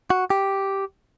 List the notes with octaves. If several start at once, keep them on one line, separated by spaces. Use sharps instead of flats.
F#4
G4